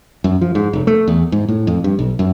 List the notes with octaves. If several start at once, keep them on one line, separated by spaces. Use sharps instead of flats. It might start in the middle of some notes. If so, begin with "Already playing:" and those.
F#2
F3
G#2
F1
A3
E2
G#2
A2
F2
G2
B1
F#2